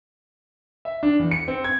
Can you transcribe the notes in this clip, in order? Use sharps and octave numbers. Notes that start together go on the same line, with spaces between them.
E5
D4
E2
C#7
C4
G#6